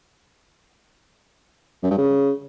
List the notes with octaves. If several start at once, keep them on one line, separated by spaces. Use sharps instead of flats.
F#2
G2
C#3